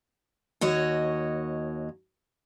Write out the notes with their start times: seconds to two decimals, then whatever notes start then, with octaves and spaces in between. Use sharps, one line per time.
0.61 D#2 F#4 C#5 D#5